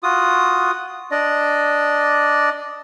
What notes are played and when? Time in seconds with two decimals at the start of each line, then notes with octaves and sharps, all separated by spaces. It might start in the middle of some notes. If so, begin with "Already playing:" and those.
0.03 F4 F#4 D#6
1.11 D4 D5 D#5